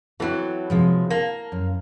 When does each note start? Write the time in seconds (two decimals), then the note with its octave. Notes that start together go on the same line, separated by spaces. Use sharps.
0.20 E3 F#3 C4 E4 A4
0.70 C3 F3 G#3
1.10 A#3 A5
1.52 F#2